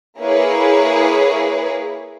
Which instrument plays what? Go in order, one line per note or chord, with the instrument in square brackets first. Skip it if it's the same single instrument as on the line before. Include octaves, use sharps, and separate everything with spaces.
[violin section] A#3 E4 G#4 B4 C#5